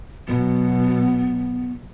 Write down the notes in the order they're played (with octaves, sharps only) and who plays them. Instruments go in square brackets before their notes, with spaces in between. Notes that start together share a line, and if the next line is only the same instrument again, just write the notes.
[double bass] B2 F#3 [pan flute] B3